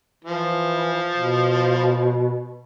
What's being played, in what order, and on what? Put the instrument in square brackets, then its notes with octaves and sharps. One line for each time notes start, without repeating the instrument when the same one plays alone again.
[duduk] E3 [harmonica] F3
[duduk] B2